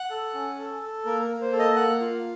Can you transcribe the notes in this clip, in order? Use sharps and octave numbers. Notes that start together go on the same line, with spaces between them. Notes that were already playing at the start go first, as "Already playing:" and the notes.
Already playing: F#5
A4
C#4
A4
A4
A#3 A#4
A#4
A#3
C5
A4
D#5
A#3 F#5
F4